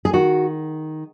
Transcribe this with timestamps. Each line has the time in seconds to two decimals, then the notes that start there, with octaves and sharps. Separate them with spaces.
0.05 G#4
0.13 D#3 F#4